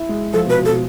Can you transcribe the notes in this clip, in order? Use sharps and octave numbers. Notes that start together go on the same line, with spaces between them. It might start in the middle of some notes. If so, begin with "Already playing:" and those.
Already playing: E4
G#3
F3 A4
B2
B4
B2
A4
B2